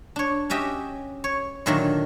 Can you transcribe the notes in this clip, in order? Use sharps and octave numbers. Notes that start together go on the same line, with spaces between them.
D4 C#5
C#4 F#4 G4 D#5 E5
C#5
A#2 D3 D#3 F#3 A3 D4